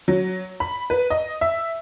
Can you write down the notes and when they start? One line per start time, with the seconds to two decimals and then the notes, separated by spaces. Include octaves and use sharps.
0.08 F#3
0.60 B5
0.90 B4
1.10 D#5
1.41 E5